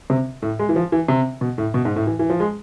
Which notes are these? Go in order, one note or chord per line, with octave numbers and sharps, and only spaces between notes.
C3
A2
G#3
E3
F3
E3
C3
B2
A2
B2
G#2
A2
E3
E3
F3
G#3